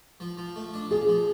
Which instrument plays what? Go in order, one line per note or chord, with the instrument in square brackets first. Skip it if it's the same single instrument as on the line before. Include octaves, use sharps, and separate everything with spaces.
[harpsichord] F3
F3
A3
D4
[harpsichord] F3 [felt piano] G#4
[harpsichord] F3